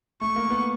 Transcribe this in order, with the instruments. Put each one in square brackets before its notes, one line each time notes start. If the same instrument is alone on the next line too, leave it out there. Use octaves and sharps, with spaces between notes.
[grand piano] A3 [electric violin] C#6
[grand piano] A#3
B3